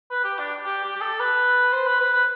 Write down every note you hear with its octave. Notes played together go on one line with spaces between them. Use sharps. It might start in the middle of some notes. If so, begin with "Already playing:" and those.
B4
G4
D4
G4
G4
G4
A4
B4
C5
B4
B4
B4